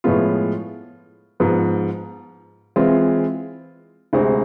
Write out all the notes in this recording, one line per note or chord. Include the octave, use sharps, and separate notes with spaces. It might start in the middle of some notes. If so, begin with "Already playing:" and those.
A2 F3 G#3 B3 F4
G#2 F3 B3 F4
E3 G#3 C4 F4
D2 C3 G#3 C4